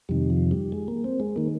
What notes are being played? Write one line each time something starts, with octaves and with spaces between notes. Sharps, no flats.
F2 C3 D#3 G3
F3
G3
G#3
A#3
C4
G#3
D#3 A#3